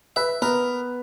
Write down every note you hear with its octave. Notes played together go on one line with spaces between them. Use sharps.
B4 E5
B3 A#4 B4